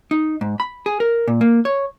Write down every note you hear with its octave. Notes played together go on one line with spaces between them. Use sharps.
D#4
G#2
B5
G#4
A#4
A#2
A#3
C#5